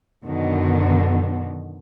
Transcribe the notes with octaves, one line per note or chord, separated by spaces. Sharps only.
F#2 B2 D3 D#3